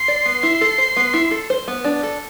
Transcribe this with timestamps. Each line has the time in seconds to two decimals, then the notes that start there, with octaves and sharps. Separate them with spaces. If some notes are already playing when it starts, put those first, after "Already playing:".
Already playing: C6
0.08 D5
0.26 B3
0.43 E4
0.61 A4
0.78 C5
0.97 B3
1.14 E4
1.31 A4
1.50 C5
1.68 B3
1.85 D4
2.03 A4